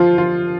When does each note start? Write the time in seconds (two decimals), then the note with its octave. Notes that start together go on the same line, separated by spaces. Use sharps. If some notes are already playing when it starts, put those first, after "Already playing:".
Already playing: F3 F4
0.18 F4